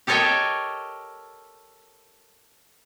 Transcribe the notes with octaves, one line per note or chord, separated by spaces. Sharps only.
G4 A4 A#4 C#5 D#5 G5